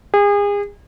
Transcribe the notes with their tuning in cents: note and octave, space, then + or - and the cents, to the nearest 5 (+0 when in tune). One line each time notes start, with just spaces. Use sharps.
G#4 -35